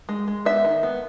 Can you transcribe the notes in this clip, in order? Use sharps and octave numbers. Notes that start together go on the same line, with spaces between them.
G#3
G#3
B3 E5
D#3
B3